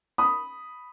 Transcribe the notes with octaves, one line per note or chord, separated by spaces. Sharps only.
B5 D#6